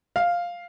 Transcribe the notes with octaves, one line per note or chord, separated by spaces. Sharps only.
F5